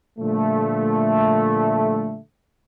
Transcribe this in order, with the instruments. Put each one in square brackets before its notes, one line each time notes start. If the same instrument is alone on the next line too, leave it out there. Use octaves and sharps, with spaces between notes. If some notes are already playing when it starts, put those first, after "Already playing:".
[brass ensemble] A#2 D3 F3 G3 A3